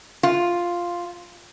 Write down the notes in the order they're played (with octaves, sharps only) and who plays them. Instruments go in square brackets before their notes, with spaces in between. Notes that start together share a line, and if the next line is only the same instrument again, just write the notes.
[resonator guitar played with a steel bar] F4